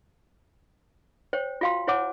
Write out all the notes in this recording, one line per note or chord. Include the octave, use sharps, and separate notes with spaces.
C5 C#5 G5
F4 F#4 F5 G5 C6
E4 C5 C#5 F#5 G#5 D6